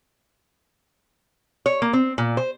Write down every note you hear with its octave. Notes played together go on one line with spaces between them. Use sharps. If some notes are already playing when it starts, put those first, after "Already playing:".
C#5
A#3
C4
A#2
C5